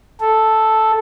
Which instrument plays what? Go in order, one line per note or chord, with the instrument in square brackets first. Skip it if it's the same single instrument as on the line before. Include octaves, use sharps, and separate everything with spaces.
[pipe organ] A4